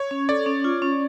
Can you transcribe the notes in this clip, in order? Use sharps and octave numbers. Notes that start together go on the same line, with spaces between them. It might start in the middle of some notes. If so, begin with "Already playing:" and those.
Already playing: C#5
C#4
A4 D5
C#4
F4
C#4